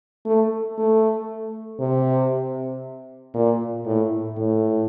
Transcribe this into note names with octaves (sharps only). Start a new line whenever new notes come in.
A3
A3
C3
A#2
A2
A2